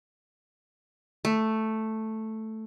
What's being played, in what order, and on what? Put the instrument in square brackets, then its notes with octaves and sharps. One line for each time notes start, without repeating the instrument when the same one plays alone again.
[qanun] A3